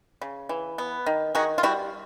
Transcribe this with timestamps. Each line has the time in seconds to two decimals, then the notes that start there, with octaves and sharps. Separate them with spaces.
0.21 C#3
0.49 E3
0.78 B3
1.06 D#3
1.35 D#3 F#4 G#4
1.58 F4
1.63 G3 E4 F#4